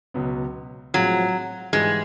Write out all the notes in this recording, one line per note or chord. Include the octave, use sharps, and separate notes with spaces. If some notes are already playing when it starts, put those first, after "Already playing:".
C#2 B2 F#3 B3
A2 F3 F#3 G#3 C4 F4
G#2 E3 G3 G#3